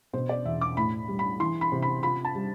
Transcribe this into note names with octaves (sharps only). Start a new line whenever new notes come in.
B2 C5
D5
E2 E5
D6
A2 B5
G3
B5
E3 C6
B5
C3
B5
F4 B5
A5
G3